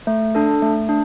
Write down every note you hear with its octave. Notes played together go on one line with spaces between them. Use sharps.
A3
D4 A4
A3
D4